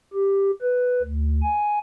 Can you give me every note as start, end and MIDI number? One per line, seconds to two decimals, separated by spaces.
0.13 0.51 67
0.62 1.02 71
1.03 1.42 38
1.42 1.79 80